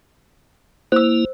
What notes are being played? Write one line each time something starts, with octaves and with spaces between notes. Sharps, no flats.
A#3 E4 C5 E6